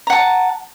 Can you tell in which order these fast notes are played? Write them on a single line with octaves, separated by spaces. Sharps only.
A#5 F#5 A5